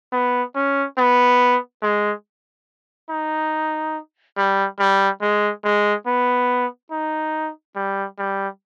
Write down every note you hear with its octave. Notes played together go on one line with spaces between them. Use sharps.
B3
C#4
B3
G#3
D#4
G3
G3
G#3
G#3
B3
D#4
G3
G3